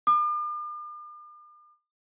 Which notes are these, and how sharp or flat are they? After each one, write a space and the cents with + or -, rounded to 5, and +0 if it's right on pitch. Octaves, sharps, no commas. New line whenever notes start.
D6 +45